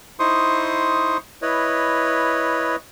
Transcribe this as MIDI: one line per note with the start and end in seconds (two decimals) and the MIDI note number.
0.19 1.17 63
0.19 1.17 64
0.19 1.17 72
0.19 1.17 84
0.19 1.17 85
0.19 1.17 87
1.42 2.76 64
1.42 2.76 71
1.42 2.76 73
1.42 2.76 75